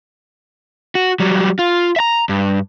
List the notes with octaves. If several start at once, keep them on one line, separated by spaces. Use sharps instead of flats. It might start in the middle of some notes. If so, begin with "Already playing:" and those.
F#4
F#3 G3
F4
E5 A#5
G2